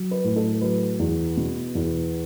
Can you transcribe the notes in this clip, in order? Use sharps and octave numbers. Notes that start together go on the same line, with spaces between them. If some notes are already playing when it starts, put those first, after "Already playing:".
Already playing: F#3
B4
A2
A4
F#3 B4
E2
B2
E2